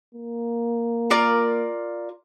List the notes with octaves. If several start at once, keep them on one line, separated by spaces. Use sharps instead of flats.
A#3
F4 A#4 D5